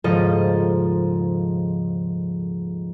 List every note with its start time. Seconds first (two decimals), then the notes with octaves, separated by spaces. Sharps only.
0.04 D#1 G#2 C#3 F3 A4 D#5